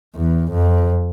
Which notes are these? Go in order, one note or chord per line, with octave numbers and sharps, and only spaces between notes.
E2
F2